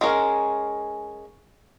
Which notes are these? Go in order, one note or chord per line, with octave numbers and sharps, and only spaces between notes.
G#3 C#4 A#4